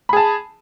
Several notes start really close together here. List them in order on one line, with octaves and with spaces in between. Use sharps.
B5 G#4 A5